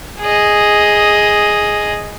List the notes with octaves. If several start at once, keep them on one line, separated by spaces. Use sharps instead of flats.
G#4 D#5